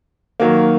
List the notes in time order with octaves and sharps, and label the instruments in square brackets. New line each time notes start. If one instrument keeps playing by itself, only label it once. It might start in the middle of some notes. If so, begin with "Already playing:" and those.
[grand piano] D#3 F#3 A#3